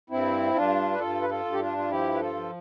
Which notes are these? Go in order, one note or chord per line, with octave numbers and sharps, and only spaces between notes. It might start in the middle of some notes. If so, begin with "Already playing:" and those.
G2 C4 E4
G2 D4 F4
B4
G2 F4 A4
B4
F4 A4
G2
G4
D4 F4
F4
F3 E4 G4
B4
F4 A4
F3